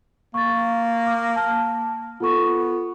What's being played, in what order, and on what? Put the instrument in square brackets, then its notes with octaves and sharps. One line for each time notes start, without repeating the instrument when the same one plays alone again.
[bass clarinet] A#3 [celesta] C#6 A6
[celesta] D6 F6
A5 F6
[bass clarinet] B3 [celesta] F4 A4 C#6